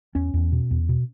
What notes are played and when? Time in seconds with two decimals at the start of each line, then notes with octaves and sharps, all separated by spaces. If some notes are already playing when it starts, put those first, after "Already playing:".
0.15 E2 C#4
0.34 E2
0.52 B2
0.71 E2
0.89 B2